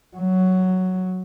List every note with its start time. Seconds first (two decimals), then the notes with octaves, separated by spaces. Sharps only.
0.16 F#3